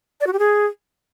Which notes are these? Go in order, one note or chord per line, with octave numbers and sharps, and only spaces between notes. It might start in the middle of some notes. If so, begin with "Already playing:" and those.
D5
F#4
G4
G#4